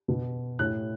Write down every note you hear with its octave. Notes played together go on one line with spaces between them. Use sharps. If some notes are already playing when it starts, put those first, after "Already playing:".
B2
A2 F#6